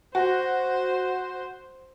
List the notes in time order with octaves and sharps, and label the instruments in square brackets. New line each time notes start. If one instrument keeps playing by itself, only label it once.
[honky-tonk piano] F#4 [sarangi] C5